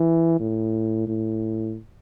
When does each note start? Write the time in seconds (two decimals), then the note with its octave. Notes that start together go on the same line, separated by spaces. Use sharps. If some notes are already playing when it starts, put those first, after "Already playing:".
Already playing: E3
0.40 A2
1.07 A2